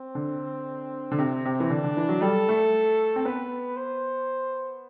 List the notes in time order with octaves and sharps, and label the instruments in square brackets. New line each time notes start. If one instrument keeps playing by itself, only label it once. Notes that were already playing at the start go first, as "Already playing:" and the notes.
Already playing: [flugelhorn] C4
[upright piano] D3
D3
C3
C3
E3
[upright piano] D3 [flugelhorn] D4
[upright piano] D3
E3
F#3
[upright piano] G3 [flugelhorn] A4
[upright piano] A3
C4
[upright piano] B3 [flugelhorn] B4
[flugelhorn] C5